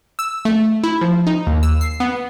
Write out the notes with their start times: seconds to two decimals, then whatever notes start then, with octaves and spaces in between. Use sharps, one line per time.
0.19 E6
0.45 A3
0.84 E4
1.01 F3
1.27 D#4
1.47 D#2
1.63 E6
1.81 C7
2.00 B3